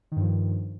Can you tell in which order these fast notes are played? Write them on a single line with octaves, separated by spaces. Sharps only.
D#3 G2 F3